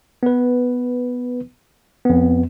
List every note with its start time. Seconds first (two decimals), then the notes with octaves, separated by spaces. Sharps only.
0.23 B3 B4
2.05 F2 B3